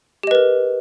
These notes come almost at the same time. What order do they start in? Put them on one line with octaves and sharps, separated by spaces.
G4 D#5 B4 A#4